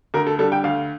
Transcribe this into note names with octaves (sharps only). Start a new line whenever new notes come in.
D2 A#4
A4
D3 G3 A4
G5
D2 F5